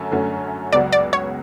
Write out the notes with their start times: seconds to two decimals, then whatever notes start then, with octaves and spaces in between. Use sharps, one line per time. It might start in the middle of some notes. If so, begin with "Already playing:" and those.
Already playing: F#2 D3 A3 C#4 F#4
0.11 F#2 D3 A3 C#4 F#4
0.72 C#2 C#3 F#3 B3 F#4 D5
0.92 D5
1.13 C#5